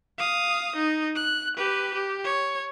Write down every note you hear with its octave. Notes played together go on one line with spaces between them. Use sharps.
F5 D#6
D#4
F#6
G4 B4
G4
C#5